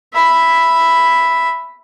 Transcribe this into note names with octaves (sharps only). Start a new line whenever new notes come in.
E5 B5